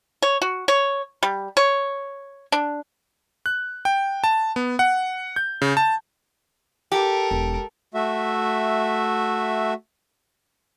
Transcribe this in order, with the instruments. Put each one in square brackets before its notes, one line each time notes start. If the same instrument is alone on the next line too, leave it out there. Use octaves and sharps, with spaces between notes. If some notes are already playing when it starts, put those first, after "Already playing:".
[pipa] C#5
F#4
C#5
G3
C#5
D4
[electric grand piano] F#6
G5
A5
B3
F#5
G6
C#3
A5
[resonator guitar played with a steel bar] G4 [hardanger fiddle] A4 A#4
[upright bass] E1
[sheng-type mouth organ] A3 F#4 E5